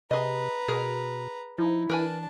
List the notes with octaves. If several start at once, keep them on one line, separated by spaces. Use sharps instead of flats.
C3 G#4 B4 D#5 A#5
B2 G#4 A#4
F3 D#4 E4
E3 D4 A#4 B4 G#5 A5